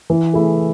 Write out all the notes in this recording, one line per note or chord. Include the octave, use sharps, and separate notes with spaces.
E3
A3 E4 G#4